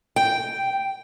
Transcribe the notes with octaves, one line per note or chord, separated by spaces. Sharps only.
G5